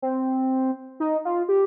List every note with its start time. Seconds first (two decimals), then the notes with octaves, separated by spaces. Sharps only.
0.02 C4
1.00 D#4
1.25 F4
1.49 G4